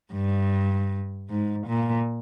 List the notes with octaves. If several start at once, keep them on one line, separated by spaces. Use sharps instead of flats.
G2
G#2
A#2